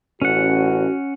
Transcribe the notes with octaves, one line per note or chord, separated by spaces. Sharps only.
A1 C#4 F#4 F#5